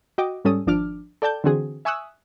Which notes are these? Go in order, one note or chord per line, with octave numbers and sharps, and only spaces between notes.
F#4 D#5 G5 D6
G#2 G3 C#4 A4 D#6
G#1 F3 D4 D6 F6
A4 D5 G5 A5 G6
D3 E3 C4 F#4 G#4
E5 G#5 C#6 D#6 E6 F#6